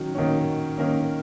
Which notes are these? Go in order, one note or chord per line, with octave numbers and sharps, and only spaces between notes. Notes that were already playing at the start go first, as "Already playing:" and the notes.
Already playing: D#3 F#3 C#4 F#4
D#3 A#3 C#4
D#3 A#3 C#4 A#4